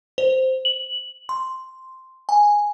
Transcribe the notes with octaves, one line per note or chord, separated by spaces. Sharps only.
C5
F#7
C6
G#5